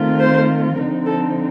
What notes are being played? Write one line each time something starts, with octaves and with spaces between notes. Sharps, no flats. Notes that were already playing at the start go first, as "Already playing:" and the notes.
Already playing: D#3 A3 C4 F4
C5
D3 F3 C4 D#4 A#4
A4